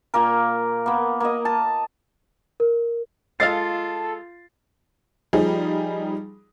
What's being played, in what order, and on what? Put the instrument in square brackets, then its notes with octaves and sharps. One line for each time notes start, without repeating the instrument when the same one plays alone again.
[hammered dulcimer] A#2 A#3 A#4
A#3 B3
A#3 D#5
A5
[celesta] A#4
[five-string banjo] G#3 D#5 F5 [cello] F4 [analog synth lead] A4 [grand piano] A6 C7
[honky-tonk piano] F3 G3 D#4 G#4